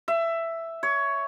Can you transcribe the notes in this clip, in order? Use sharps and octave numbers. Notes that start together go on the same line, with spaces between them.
E5
C#5